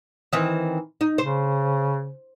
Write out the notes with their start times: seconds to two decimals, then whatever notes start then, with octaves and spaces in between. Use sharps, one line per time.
0.33 D#3 E3 C4
1.01 D#4
1.18 C#3 C5